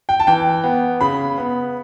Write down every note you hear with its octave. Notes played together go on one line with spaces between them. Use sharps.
G5
A5
E3 G5
B3
C#3 B5
B3